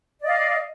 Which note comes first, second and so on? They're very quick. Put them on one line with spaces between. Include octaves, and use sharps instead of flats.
D5 D#5 F5